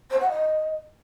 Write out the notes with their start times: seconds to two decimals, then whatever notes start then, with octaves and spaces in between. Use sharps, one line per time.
0.10 C5
0.20 F#5
0.30 D#5